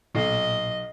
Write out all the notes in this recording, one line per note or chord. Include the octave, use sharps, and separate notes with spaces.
B1 A#2 D#5 C7